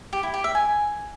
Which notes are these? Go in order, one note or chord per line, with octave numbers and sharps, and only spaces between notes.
G4
E4
G4
E5
G#5